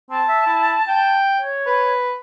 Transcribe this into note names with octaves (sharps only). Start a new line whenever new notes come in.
C4 A5
E5
E4
G5
C#5
B4